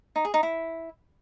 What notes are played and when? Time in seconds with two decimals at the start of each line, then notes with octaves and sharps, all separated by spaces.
0.16 D#4
0.25 G#4
0.34 D#4
0.43 E4